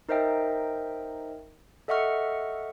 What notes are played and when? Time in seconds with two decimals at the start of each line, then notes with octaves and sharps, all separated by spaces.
0.09 D#4 A#4 C5 D#5 E5 G5
1.88 A4 D#5 E5 F#5 C#6 F6